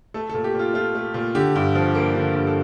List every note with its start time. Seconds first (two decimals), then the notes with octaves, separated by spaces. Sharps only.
0.14 A3 A4
0.29 A#2 A4
0.44 G4
0.55 A#2 F4
0.74 A3 F4
0.95 A3
1.14 A#2
1.35 D3 G4
1.56 G2
1.75 F3
1.95 A#3
2.15 D3
2.35 G2
2.47 A4